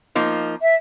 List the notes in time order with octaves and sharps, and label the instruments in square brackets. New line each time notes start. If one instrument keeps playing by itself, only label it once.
[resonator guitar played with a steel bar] F3 A#3 D#4
[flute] E5